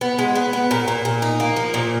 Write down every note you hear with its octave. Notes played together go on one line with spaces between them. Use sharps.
B3
G#3
B3
B3
A#2
A#2
A#2
D#4
A#3
F3
A#2